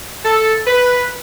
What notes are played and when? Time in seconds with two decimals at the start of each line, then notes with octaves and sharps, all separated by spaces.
0.25 A4
0.67 B4